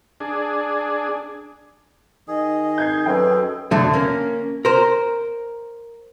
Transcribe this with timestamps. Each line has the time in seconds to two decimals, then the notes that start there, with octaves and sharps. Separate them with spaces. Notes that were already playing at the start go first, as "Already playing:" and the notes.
0.20 D4 G#4
2.28 D#3 G#4 D#5
2.78 G6 G#6 C7
3.06 F#2 A4 B4 D#5 G5
3.71 B1 F2 D3 A3
3.93 A#3 C#4
4.65 A#4 C5